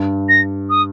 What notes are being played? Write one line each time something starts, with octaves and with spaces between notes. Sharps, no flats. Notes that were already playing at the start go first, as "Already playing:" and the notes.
Already playing: G2
A#6
D#6